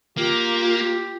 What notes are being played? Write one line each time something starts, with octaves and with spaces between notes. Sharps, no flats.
A#3 F4 G4